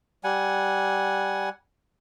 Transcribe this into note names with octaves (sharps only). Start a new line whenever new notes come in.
G3 F#5 G#5